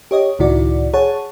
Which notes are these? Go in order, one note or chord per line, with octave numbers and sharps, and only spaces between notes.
G4 C#5 D#5
C#2 A2 D#3 E4 F#4 D5
G#4 C#5 F#5 A5